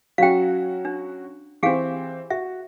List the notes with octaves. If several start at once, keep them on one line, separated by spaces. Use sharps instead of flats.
F#3 C#4 F#4 F5 G5
D4
E3 C4 G4 G#4 F5
F#4 E5